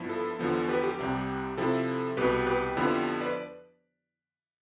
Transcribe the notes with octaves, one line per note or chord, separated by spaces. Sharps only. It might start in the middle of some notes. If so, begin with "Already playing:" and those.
Already playing: G2 F3 B3 E4
A4
E2 D3 F3 B3
G4 B4
G4
C2 C3 G3
C3 F3 C4 E4 A4
C2 B2 B3 G4 B4
G4 B4
F2 D3 F3 B3 E4
B4 D5